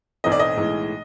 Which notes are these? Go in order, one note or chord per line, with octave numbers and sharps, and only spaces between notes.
B1 A2 E3 A3 C4 D#5
D5
D#5
B1 A2 E3 G#3